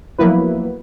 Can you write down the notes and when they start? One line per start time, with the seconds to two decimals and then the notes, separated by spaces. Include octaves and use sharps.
0.18 F3 F#3 A#3 B3 E4 B4